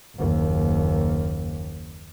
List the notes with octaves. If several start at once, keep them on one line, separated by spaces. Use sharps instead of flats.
F#1 D#2